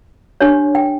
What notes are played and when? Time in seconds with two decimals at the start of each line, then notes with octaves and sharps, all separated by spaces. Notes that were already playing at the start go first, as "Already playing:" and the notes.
0.41 D4 G4 C#5
0.75 G5